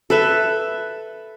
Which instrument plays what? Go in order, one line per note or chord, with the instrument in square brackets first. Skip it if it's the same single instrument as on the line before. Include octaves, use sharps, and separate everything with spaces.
[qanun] A4 B4 E5